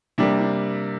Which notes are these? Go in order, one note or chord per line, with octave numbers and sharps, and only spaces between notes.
C3 G3 A#3 D4
D4